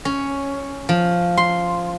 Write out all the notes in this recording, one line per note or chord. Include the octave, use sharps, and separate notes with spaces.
C#4
F3
C6